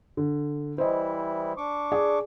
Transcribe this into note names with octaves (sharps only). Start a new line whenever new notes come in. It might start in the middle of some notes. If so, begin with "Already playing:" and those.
D3
E3 G3 E4 C5 D#5
D4 C#6 D6
G#4 D5